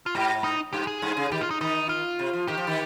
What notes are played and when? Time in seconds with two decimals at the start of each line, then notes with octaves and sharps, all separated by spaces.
0.06 F4
0.15 G#2 G4
0.44 D#4
0.73 G2 G4
0.87 G#4
1.02 G2
1.17 C#3
1.31 D#3 G4
1.41 F4
1.51 D#4
1.61 D#3 D#4
1.89 F4
2.19 C3
2.33 F3
2.47 D#3 G4
2.57 F3
2.67 D#3